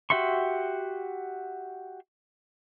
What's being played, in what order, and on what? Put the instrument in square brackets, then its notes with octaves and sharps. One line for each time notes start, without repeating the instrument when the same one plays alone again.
[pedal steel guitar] F#4 G4 E5 C6 C#6